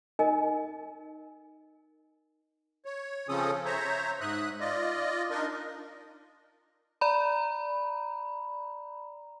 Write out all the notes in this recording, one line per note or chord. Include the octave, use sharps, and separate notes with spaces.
D#4 A#4 D#5 G#5
C#5
C#3 F3 C4 C#4 A4 D#6
C5 C#5 E5 A#5
G#2 E5 D#6 F#6
F4 D5 D#5
D4 D#4 A#4 D#5
D5 A#5 B5